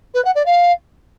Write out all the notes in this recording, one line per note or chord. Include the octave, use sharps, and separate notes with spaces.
B4
F#5
D5
F5